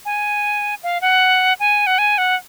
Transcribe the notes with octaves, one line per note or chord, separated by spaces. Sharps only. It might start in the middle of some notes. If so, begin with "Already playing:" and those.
G#5
F5
F#5
G#5
F#5
G#5
F#5